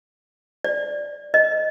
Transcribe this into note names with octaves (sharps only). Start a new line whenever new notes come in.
D5
D#5